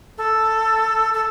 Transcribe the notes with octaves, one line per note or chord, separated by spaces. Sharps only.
A4
A4